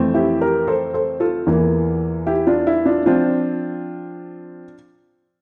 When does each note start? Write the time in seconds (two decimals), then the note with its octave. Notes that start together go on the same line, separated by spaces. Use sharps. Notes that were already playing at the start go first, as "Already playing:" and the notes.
Already playing: F2 E3 A3 C4
0.14 E4 G4
0.41 G4 A#4
0.67 A4 C5
0.94 A4 C5
1.20 F4 A4
1.46 E2 E3 A#3
2.27 E4 G4
2.47 D4 F4
2.67 E4
2.86 D4 F4
3.06 F3 C4 D4 F4